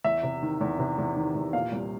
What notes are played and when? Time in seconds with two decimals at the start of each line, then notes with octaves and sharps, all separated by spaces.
0.04 E2 E5
0.23 C3
0.42 D#3
0.61 E2
0.79 C3
0.98 E2
1.16 D#3
1.35 E2
1.53 A#2 F5
1.72 C2